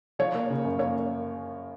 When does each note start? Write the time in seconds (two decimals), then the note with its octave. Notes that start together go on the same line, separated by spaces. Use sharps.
0.19 F3 C#5
0.35 A#3
0.50 C#3
0.65 F#2
0.79 A#3 C#5